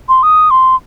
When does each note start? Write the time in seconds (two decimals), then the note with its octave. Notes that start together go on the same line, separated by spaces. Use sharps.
0.09 C6
0.23 D#6
0.51 C6